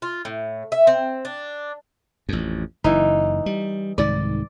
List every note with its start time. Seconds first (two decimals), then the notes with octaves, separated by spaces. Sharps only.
0.02 F4
0.25 A2
0.72 E5
0.87 C4
1.25 D4
2.29 A1 F2
2.84 F#1 E3 D#4
3.46 G3
3.98 C2 G#2 D#3 D5